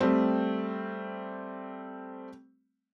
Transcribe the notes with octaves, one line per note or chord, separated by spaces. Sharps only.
G3 A3 C4